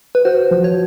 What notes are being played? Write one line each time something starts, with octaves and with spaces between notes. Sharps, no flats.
B4
F#4 C5
F3
C#5